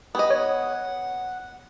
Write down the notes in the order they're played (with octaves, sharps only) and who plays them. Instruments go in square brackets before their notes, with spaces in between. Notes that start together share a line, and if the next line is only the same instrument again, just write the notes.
[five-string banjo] B3 D#5 [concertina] G4 G#4
[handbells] C#5 [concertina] F#5